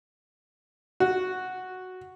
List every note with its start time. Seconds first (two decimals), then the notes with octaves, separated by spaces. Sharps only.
1.00 F#4